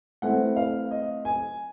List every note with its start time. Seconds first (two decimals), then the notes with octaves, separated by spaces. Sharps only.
0.22 E3 A3 C4 E4 F#5
0.56 F5
0.91 D#5
1.25 G#5